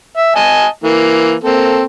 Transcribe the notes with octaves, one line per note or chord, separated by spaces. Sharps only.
E5
D#5 G#5 A5
E3 A#3
A#3 C4 A4